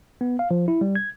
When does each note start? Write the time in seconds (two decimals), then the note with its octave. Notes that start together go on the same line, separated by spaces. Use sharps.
0.21 B3
0.39 F5
0.51 F3
0.68 E4
0.81 G3
0.95 G#6